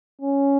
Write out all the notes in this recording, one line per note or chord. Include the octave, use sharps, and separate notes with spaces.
C#4